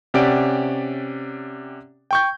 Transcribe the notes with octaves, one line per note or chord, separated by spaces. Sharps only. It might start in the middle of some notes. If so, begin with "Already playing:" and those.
C3 C#4 G4 D5 F#5 D7
G5 C#6 G6